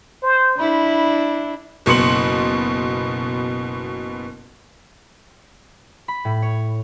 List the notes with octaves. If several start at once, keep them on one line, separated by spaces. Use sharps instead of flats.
C5
D4 E4 B5
F#1 B2 C6 C#7 F#7
B5
A2
C#5